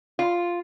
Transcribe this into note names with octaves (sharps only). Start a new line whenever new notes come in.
F4